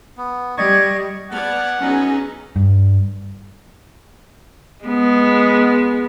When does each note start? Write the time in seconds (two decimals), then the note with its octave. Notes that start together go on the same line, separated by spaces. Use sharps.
0.17 B3
0.57 G3 D5 D#5 C#6 G#6
1.31 B3 D5 F#5 A5 F6 G#6
1.81 F#3 B3 C#4 D#4 G#4
2.56 G2
4.84 G#3 B3